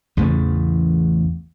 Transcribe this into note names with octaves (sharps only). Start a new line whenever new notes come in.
A1 E2 C#3 A3